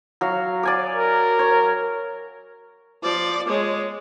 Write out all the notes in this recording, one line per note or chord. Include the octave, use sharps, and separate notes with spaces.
F#3 F5
D5 G#5 D6
A#4
C#5
F3 D5
G#3 C#5